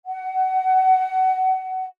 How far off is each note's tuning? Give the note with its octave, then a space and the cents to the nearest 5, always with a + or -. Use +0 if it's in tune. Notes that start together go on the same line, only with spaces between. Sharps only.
F#5 +25